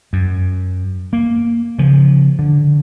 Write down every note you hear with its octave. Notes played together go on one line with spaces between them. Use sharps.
F#2
A#3
C#3 F3
D3